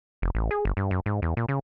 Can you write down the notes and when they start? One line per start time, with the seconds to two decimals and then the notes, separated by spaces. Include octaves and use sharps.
0.22 F1
0.35 A1
0.51 G#4
0.65 G1
0.77 G2
0.91 F#2
1.06 G#2
1.22 E2
1.37 A#2
1.49 C#3